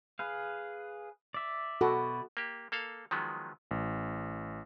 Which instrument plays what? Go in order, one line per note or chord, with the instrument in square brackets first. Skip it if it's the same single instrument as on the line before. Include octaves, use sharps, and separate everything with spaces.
[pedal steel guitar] G#4 B4 F5
D5 E5
[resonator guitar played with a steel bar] B2 [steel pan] F#4 A4
[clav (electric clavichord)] A#3 G4
A#3 A4 F5
D#3 F3 F#3 G#3 B3
[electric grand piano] A1